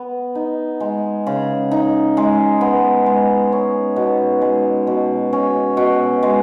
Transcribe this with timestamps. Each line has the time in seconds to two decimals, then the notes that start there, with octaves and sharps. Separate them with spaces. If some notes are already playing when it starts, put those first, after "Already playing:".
Already playing: B3
0.35 D#4
0.80 G#3
1.27 C#3
1.71 D#4
2.17 G#3
2.61 B3
3.06 G#3
3.52 C#4
3.96 B2
4.41 G#3
4.87 B2
5.33 C#4
5.77 B2
6.23 G#3